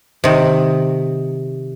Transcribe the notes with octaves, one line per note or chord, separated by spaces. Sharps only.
C3 D#3